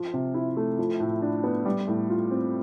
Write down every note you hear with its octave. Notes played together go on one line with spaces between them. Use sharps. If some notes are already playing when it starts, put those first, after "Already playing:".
Already playing: F3 F4
C3
E4
A3
F3
A2
D4
B3
G3
A2
F4
C4